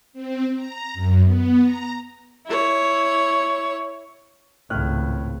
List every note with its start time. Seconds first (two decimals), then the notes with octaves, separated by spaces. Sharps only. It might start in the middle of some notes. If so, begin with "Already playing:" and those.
0.13 C4
0.55 A#5
0.94 F#2
1.23 B3
1.61 A#5
2.46 E4 C#5
4.70 G#1 C#2 A2 F6 F#6